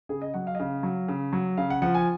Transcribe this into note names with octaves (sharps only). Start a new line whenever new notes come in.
C#3 G#4
D#5
F#3 F#5
F5
D#5
C#3 F5
F#3
C#3
F#3
C#3 F5
F#5
F3 F#5
G#5